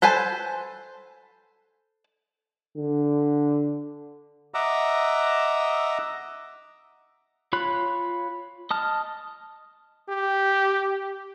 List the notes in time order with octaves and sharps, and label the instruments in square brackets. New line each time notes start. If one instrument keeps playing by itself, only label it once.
[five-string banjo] A4 B4 C5 G#5 A5
[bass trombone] D3
[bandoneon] D#5 E5 F#5 A#5 D6 E6
[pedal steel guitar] F4 C#5 B5 F#6
D#5 A5 F6
[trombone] G4